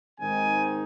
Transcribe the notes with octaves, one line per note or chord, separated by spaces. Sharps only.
G#2 D#3 G#3 C4 D#4 G#5